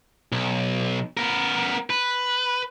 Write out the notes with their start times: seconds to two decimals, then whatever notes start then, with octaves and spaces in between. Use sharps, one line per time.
0.32 B1
1.17 B3 A#4
1.90 B4